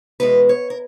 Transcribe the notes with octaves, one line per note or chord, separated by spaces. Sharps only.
E2 B2 G#3 B4
C#5
A#4